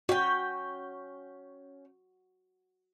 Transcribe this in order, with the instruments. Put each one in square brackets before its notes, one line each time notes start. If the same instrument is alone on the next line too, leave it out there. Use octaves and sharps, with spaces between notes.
[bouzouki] C#4 G5 [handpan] F#4